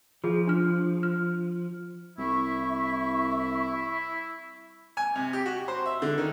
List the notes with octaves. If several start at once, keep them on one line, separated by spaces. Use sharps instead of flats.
F3 F4 G#4
D4 F6
F6
C2 E4 E5 C#6
G#5
C3
G4
F#4
C5
E5
D3
D#3